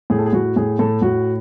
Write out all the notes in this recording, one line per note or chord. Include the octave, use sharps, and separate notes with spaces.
A2 G#4
A4
G#4
A2 F#4
A2 G#4
A2 A4
A2 F#4